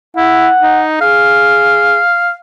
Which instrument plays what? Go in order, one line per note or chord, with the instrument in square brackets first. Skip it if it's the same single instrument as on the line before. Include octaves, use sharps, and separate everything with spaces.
[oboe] E4 [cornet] F#5
[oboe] D#4
[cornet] G#4 [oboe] F5